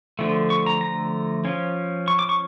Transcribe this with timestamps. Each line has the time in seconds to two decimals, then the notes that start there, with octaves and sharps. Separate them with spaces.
0.19 D3 F3 A3
0.50 C#6
0.66 A#5
0.81 A#5
1.45 F3 C#4
2.08 C#6
2.19 D6
2.29 C#6